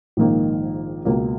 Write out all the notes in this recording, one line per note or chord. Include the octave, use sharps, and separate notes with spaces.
A#1 G#2 D#3 A#3 D#4
C#2 B2 A#3